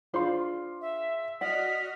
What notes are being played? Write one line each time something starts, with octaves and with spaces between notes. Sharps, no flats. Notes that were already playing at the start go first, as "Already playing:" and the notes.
D4 F4 G#4 C5 F5 C6
E5
F#4 D5 D#5 F#5 F6 B6